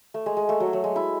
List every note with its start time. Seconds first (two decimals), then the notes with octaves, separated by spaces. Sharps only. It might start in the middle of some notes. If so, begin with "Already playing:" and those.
0.14 A3
0.26 G#3
0.37 G#3
0.49 A3
0.60 F#3
0.73 F#3
0.84 G#3
0.96 E4